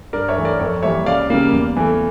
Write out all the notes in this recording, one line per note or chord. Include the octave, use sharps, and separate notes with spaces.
G2 A#4 D5
C#5 E5
E3 A3
A#4 D5
F2 A4 C#5
E3 G3 A#3 C#5 E5
C#2 D5 F5
C#3 G3 A#3
E2
E3 A3